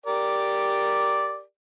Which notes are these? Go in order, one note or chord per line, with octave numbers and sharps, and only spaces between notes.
G4 A#4 D5